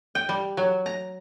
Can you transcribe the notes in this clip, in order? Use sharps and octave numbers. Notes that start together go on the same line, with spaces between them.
G5
G3
F#3
A#5